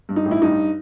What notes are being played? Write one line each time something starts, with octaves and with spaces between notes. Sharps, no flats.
G2
D#4
A1
E4
G2 D#4